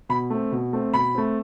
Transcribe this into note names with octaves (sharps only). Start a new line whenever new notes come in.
B2 B5
A3 C4
B2
A3 C4
B2 B5
A3 C4